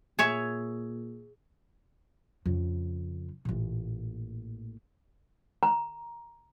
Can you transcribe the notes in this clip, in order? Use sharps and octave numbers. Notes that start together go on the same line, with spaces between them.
A#2 G#4 C#5 E5
F2 C#3
A1 A#2
A#5